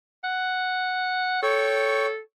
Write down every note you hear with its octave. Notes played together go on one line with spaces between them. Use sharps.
F#5
A4 C#5 G5 C#6